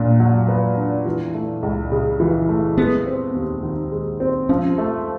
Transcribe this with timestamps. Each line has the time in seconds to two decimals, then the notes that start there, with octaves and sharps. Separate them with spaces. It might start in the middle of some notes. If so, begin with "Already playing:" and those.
Already playing: A#2 A#3 D4
0.20 F#3
0.48 B3
0.77 D4
1.05 E3
1.34 A3
1.63 C#2
1.92 C#3
2.20 E3
2.49 A3
2.77 G#3 B3
3.06 C4
3.35 D#2
3.63 D#3
3.92 G#3
4.20 C4
4.49 F3 C#4
4.78 A3